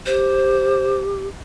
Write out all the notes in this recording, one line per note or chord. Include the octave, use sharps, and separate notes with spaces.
G4 C5